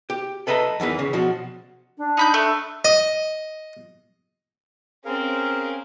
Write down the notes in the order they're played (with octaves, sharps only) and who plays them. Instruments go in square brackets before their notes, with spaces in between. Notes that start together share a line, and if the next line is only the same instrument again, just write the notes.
[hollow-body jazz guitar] G4
A4 B4 D#5 E5 A#5
E2 D#3 E3 B4
C#3
B2 F3 F#4
[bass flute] D4
[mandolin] D#4 B5 G6
A3
[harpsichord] D#5
[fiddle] C4 C#4 [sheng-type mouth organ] G#4 A#4 F5